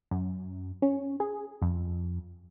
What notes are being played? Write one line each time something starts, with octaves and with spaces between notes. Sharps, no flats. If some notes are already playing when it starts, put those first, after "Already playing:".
F#2
C#4
G#4
F2